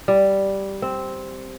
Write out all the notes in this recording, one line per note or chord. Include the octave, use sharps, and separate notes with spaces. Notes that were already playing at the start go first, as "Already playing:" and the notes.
G3
C4